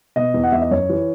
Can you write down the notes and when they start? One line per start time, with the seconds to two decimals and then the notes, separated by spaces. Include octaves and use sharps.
0.16 B2 D#5
0.34 E2
0.43 F#5
0.52 E2 E5
0.62 D#5
0.71 F#2 C#5
0.89 E3